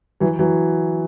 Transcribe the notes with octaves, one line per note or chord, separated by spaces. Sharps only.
E3 F#3
E3 F#3